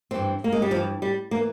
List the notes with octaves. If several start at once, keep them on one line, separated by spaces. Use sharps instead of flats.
G2 E3 C4
A#3
G#3
G3
G2 E3 F3
G3
E3 A#3